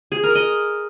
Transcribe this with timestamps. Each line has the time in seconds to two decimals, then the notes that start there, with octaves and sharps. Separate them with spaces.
0.12 G#4
0.23 A#4
0.35 D#5